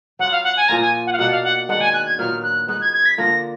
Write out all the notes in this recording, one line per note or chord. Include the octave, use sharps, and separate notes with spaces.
F#3 B3 F4 F#5
F5
F#5
G#5
A#2 F3 A#3 F4 A#5
G#5
F#5
F5
B2 A#3 D4 F#5
F5
F#5
D#3 G#3 D4 F#5
G#5
F#6
G#6
A#2 F#3 B3 F6
F#6
G#3 B3 D#4 F#6
G#6
G#6
B6
D3 F3 A#3 D4 A#6